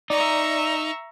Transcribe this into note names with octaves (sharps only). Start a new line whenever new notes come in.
D#4 D5 E5 A#5 C#6